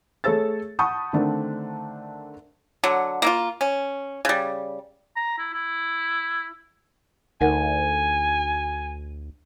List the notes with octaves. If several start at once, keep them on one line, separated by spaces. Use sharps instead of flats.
A3 G#4 A4 C#5 E6 A6
F#5 A5 B5 C#6 D#6 G6
D3 D#3 A3 C4 D4
D3 F#3
A#3 E4 F4
C#4
C#3 G3
A#5
E4
E4
D2 D#4 A#4 F#5 G#5